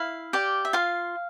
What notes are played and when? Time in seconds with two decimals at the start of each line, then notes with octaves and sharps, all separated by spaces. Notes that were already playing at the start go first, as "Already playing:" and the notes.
Already playing: E4 F5
0.33 G4 D5
0.65 E5
0.73 F4 F5